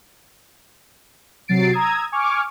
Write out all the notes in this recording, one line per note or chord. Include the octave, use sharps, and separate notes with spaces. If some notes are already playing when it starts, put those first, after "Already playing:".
C3 F#3 A6 C7 D7
A#5 D#6 E6 G#6
G#5 C#6 D6 F6